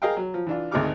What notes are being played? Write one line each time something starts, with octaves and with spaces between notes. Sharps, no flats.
G#4 A#4 D#5 F5 G5
F#3
F3
E3 D4 F4
G#1 D2 D#4 G#4 D6 F6